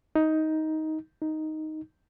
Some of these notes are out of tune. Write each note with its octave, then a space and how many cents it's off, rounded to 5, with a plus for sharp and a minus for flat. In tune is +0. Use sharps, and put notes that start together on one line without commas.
D#4 +10
D#4 +0